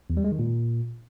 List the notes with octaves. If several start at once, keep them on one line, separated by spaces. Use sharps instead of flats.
E2
G3
G#3
D#3
A#2